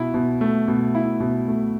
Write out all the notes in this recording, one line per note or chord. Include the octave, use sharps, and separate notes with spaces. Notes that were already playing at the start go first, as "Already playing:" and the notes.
Already playing: B2 E4
B2
A3
B2
E4
B2
A3